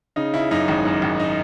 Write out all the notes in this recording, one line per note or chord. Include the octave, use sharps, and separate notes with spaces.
C#3 D#4
C#3 E4
F#2 D#4
G#1
F#2
G#1
D#4